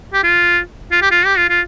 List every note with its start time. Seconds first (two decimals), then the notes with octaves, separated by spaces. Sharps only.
0.13 G4
0.23 F4
0.91 F4
1.02 G4
1.11 F4
1.26 G4
1.37 F4
1.49 F4